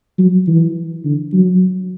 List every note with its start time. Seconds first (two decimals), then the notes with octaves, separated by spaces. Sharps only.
0.18 F#3
0.48 E3
1.05 D3
1.33 F#3